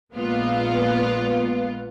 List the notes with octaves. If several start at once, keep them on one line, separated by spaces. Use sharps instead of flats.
A#1 A#2 G#3 B3 F4